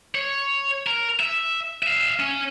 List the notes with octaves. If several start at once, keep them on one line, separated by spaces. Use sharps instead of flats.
C#5
A#4
E5
E5 F5
C#4